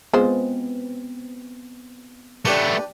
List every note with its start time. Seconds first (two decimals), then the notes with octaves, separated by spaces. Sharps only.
0.13 G#3 B3 C4 F4 C5
2.45 A3 B3 D4 G4 B4